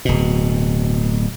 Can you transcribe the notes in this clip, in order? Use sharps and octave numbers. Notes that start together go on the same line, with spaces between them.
D1 B2